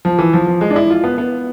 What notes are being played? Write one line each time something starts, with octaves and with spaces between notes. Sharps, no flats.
F3
E3
F3
F3
G#3
D4
E4
F4
B3
B3